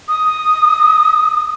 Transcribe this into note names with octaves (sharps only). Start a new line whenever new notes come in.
D#6